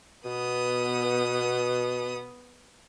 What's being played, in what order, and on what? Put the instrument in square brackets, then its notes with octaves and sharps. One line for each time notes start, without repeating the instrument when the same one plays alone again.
[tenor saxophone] B2 [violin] B3 D#6